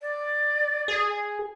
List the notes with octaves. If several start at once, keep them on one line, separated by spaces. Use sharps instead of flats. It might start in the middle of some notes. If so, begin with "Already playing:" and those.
D5
G#4